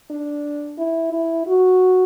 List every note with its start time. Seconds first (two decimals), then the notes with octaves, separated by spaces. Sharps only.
0.10 D4
0.78 E4
1.12 E4
1.46 F#4